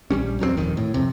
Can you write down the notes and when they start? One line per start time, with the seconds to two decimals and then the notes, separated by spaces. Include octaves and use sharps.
0.11 A#1 G3 C#4
0.40 E2 F#3 G3 C4
0.57 D#1 F2 D#3
0.77 A2
0.94 F2 C3